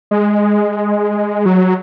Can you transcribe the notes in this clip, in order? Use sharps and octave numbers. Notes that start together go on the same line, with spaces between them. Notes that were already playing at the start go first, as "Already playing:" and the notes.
G#3
F#3